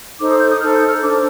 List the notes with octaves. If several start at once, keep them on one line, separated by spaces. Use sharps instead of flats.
D#4 A4 C5 D6
D#6
G6
D#6
D#4 A4 C5 F6
G6
F6
D4 A4 C5 D6